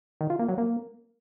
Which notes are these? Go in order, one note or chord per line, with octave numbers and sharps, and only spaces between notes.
D#3
F4
A#3
F#3
A#3